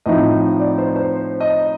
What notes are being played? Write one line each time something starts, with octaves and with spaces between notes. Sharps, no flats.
A2 F3 C4 D#4 D#5
D5
C5
C5
D#5